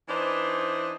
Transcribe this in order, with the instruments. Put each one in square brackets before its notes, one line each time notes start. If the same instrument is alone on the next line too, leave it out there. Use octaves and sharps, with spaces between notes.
[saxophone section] E3 D4 D#4 B4 C5